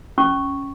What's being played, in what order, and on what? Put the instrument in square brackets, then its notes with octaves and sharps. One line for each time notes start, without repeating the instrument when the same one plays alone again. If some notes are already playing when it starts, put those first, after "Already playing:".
[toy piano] C#4 C#6